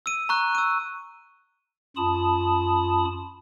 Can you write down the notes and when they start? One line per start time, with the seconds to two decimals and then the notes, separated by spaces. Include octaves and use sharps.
0.06 E6 D#7
0.29 A#5 C#6 F#6
0.55 E6 D#7
1.96 F#2 F4 A5 B5 D#6